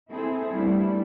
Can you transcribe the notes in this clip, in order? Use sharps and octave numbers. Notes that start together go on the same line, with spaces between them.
C4 E4 G#4 A4
G3 A3 B3 D4 E4